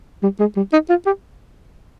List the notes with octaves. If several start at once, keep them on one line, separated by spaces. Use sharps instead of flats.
G3
G#3
G3
D#4
F4
G4